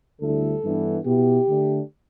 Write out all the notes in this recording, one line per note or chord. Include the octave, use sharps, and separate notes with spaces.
D2 D3 G3 E4 A4
G2 E3 B3 D4
B2 B3 E4 G4
D3 A3 D4